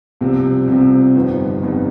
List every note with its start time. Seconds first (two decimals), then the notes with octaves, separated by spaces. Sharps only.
0.21 C2 C3 F3 C4
0.68 C2 C3 F3 C4
1.15 G1 F2 D#3 G3 B3
1.62 G1 F2 D#3 G3 B3